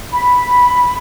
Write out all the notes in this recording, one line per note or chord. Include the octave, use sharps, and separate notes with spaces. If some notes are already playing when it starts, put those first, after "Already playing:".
B5